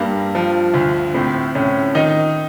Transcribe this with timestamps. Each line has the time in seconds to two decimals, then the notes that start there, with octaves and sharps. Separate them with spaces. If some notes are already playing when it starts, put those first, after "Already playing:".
Already playing: G2 G3 A#3
0.35 F3
0.74 D2
1.14 A2 C4
1.55 A2 C#4
1.95 D#3 D#4